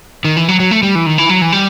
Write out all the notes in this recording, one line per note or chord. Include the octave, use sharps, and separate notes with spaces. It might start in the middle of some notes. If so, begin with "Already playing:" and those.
D#3
E3
F#3
F#3
A3
G3
E3
D#3
E3
F#3
E3
G3